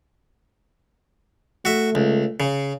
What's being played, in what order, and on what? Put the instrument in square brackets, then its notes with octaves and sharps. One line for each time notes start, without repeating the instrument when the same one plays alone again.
[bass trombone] A3 [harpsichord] F#4 E5
[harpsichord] C#2
C#3